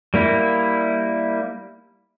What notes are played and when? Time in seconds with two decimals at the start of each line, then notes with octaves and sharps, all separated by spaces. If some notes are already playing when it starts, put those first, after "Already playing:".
0.14 G3 A#3 E4